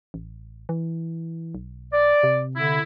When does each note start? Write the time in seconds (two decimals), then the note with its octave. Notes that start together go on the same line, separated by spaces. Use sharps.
0.14 A1
0.69 E3
1.55 B1
1.93 D5
2.23 C3
2.57 D3 E4